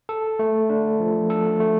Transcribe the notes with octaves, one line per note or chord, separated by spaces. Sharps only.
A4
A3
D4
F3
A4
A3